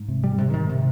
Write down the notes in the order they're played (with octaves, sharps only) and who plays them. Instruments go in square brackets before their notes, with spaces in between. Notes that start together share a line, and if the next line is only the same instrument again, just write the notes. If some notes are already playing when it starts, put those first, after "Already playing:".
Already playing: [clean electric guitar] G#2
[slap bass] C3
G3
C3
D#3
C3